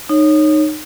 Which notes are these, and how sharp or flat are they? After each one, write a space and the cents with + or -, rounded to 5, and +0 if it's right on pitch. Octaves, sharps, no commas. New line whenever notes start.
D#4 -20 C#5 +0